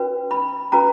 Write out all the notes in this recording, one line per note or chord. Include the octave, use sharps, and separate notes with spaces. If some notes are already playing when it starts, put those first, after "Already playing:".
Already playing: C#4 F#4 B4
B5
C#4 F#4 B4 A#5